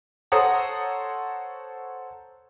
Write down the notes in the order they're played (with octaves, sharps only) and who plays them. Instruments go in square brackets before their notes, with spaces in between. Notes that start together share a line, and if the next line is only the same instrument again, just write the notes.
[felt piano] A4 C5 C#5 F#5 A#5 D#6